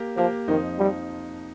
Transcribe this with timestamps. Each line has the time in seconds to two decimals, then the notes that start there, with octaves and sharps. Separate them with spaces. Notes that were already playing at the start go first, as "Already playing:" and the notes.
Already playing: A#3 G4 A#4
0.17 F3 A#3 G4 A#4
0.48 F2 D#3 F3 D#4 C5
0.79 F2 F3 G3 D#4 C5